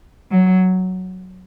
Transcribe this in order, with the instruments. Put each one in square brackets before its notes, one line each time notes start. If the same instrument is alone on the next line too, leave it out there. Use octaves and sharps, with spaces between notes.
[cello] F#3